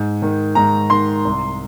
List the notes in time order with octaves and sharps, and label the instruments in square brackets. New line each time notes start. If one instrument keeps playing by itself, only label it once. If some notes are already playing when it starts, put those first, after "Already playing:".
Already playing: [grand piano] G#2
D#3
G#2 A#5
D#3 C6
C2